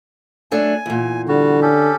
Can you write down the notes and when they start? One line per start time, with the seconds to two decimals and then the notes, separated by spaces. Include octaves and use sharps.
0.51 F#3 A3 D4 G#5
0.86 E2 A#2
1.28 D3 G3 F#4
1.62 C#4 G4 A4